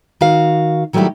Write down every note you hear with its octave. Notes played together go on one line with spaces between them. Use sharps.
D#3 F#4 F5
D#3 F#3 G3 A3 E4 G4